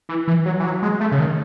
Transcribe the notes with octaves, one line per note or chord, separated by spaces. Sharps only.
E3
E3
F#3
E3
F#3
G#3
A3
C#3
D#3